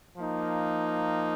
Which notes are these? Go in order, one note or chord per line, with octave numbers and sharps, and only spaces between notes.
F3 A#3 D#4